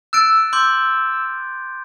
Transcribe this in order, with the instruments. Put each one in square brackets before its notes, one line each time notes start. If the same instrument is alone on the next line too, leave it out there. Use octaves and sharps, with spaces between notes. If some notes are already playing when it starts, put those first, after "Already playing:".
[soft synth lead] E6 [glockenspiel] F#6 A6 D7
[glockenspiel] C6 D6 G6